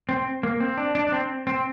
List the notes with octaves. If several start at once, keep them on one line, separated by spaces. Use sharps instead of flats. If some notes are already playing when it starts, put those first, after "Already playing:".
C4
A#3
C4
D4
D4
D4
C4
C4